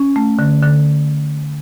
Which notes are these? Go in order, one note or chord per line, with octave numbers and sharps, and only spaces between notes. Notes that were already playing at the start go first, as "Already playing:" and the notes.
Already playing: C#4
A3
D3
D3